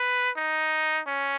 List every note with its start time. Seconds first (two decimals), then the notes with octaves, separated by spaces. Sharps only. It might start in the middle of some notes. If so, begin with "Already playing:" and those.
Already playing: B4
0.37 D#4
1.07 C#4